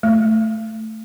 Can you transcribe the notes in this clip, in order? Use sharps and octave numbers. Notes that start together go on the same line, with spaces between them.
A3